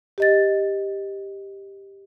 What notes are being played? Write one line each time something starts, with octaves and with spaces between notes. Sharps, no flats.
G4 D#5 A6